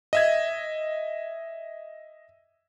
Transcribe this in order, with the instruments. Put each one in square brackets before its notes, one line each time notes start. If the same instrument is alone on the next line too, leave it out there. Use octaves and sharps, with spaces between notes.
[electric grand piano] D#5 E5 G#6